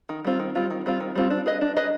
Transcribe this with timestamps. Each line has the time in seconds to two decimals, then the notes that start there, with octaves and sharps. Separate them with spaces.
0.09 D#3
0.25 G3 C4 F4
0.39 D#3
0.55 G3 C4 F4
0.71 D#3
0.86 G3 C4 F4
1.00 D#3
1.15 G3 C4 F4
1.30 D4
1.46 G#4 B4 D#5
1.61 D4
1.77 G#4 B4 D#5